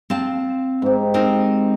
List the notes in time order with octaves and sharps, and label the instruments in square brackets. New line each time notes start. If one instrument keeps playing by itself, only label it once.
[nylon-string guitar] C4 F5 A5
[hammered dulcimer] G#2 G4
[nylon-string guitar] C4 D#4 A#4